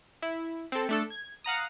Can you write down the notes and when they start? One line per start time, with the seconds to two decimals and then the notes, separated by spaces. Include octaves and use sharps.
0.22 E4
0.72 C4 A4
0.89 A3 D4 A4
1.10 G#6
1.44 F5 F#5 A#5 D#6